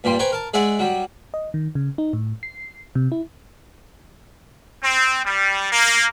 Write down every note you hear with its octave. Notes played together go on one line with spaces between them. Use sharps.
G2 A#2 G3 C6
B4 C5 G5 G#5 A#5 C#6
A#4 A5
G#3 G#4 D5 E5 F#5
F#3 G3
D#5
D#3
C#3
D#4
A2
C7
C3
E4
C4
G3
A#3